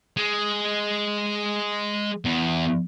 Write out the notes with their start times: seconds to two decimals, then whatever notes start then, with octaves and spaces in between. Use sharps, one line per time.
0.17 G#3
2.25 E2